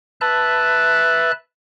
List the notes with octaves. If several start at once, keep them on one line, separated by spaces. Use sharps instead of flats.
B4 E5 A5 F#6